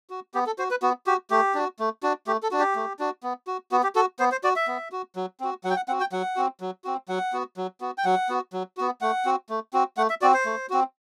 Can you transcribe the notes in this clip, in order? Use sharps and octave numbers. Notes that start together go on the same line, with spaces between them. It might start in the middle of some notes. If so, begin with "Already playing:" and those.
F#4
B3 G4
A4
F#4 C5
B4
B3 F#4
F#4 G4
A3 G4
D4 F#4
A3
D4 F#4
A3 G4
A4
D4 F#4
G4
A3
D4 F#4
B3
F#4
B3 F#4
G4
F#4 A4
B3 C5
C5
F#4 D5
E5
B3
F#4
F#3
C4 F#4
F#3 F#5
G5
F#5
C4 F#4 F#5
G5
F#3 F#5
C4 F#4
F#3
C4 F#4
F#3 F#5
B3 F#4
F#3
B3 F#4
G5
F#3 F#5
B3 F#4
F#3
B3 F#4
A3 F#5
C4 F#4
A3
C4 F#4
A3 F#5
E5
C4 F#4 D5
C5
A3
C4 F#4